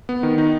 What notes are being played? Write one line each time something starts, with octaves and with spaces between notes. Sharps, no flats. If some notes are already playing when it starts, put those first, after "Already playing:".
B3
D#3
D#4